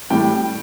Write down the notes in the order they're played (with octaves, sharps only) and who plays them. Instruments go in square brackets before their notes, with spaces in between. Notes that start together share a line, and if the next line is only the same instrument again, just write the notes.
[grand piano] A2 E3 G3 G5